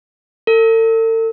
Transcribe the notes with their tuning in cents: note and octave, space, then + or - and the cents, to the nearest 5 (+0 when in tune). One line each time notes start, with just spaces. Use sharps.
A4 +40